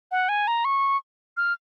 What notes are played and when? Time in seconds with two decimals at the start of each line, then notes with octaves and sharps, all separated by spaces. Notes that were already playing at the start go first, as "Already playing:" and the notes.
0.11 F#5
0.29 G#5
0.47 A#5
0.65 C#6
1.37 F6